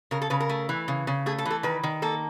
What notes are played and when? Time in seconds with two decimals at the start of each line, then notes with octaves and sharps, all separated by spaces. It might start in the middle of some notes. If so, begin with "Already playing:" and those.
0.11 C#3 A#4
0.22 A4
0.30 C#3 B4
0.40 A#4
0.49 A3
0.69 E3
0.88 C#3
1.07 C#3
1.26 A3 G#4
1.38 A4
1.45 E3
1.51 A4
1.63 D#3 B4
1.83 D#3
2.02 A#3 A4